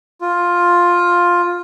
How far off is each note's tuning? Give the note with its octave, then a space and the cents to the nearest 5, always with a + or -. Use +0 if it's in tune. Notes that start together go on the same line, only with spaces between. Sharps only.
F4 +10